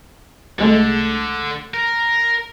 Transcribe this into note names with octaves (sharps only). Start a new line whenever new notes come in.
C2 D3 G#3 A3
A#4